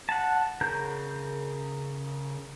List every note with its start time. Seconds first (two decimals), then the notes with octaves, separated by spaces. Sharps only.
0.09 F#5 A5
0.61 C#3 A#4 A#5 G6